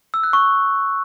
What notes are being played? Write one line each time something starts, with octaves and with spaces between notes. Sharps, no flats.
E6
F#6
C#6